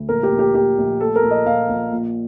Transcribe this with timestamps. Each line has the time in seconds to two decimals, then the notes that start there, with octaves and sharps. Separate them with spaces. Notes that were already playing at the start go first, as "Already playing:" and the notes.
Already playing: D2
0.09 A#1 A#4
0.23 G4
0.31 A#1
0.39 G4
0.54 A#1 G4
0.78 A#1
1.00 A3 A4
1.16 A#4
1.22 A#1
1.31 D#5
1.46 A#1 F5
1.69 A#1
1.92 A#2